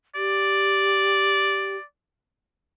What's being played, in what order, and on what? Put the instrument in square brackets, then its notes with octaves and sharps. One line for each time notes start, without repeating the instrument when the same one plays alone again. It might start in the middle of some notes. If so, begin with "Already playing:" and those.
[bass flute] G4 [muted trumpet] D5